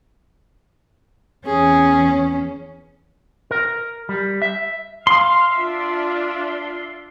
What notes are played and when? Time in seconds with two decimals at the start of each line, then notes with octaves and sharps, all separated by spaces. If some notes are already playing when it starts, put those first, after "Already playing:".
1.46 E2 C#4 G#4
3.51 A#4
4.09 G3
4.42 E5
5.07 F5 C6
5.56 D4 F4 E5